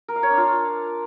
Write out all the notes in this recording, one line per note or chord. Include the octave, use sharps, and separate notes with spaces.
A#4
F5
C#5
D4
F4